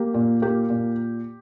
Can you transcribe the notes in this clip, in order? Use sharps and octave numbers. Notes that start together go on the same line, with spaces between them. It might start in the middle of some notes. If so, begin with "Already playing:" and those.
Already playing: A#3 G4
A#2
A#3 G4
A#2